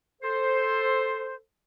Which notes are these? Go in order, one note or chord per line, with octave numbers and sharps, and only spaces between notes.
A4 C5